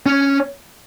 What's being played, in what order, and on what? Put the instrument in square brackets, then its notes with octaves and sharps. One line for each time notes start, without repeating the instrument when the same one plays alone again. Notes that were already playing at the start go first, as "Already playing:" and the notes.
[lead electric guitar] C#4